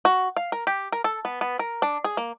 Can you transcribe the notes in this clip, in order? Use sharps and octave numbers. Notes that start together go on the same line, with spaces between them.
F#4
F5
A#4
G4
A#4
A4
B3
B3
A#4
D4
G#4
A#3